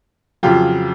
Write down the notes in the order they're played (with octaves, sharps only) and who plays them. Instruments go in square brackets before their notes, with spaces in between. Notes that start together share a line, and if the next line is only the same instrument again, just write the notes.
[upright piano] F2 C#3 F#3 F4 G4